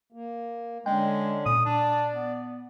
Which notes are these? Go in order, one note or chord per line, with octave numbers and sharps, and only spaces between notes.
A#3
D3 G#3 C#4 D4 G5
A#2 D#6
D4 D5
B3